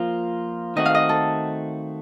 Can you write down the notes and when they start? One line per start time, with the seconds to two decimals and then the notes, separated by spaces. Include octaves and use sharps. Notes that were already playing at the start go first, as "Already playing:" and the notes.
Already playing: F3 A#3 F4
0.76 D#3 A3 C4 F#4 D#5
0.86 F5
0.95 D#5
1.09 A4